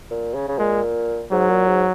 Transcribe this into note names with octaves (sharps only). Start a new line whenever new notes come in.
A#2
C#3
C#3
A#2 G#3
G#2 F#3
A#2
G#2